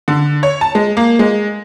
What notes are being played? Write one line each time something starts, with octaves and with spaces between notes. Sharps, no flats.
D3
C#5
A5
G#3
A#3
G#3